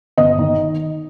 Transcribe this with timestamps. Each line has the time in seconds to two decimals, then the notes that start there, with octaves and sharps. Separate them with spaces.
0.18 G1 D#5
0.38 D#3